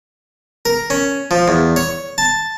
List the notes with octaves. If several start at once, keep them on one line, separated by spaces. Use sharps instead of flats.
A#4
C#4
F3
E2
C#5
A5